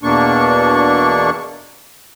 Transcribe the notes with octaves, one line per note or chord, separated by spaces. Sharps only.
E2 B2 A#3 D4 C#6